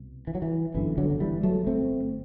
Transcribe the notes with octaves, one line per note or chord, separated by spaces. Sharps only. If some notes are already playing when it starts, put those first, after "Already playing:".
Already playing: C2 B2
E3
F#3
E3
G1 F#2 D3 E3
D3 F#3
F#3
E3 G3
F#3 A3
A3 C4